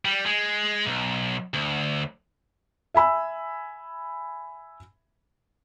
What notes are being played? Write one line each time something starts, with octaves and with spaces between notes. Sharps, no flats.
G3
G#3
B1
D2
E5 G#5 B5 E6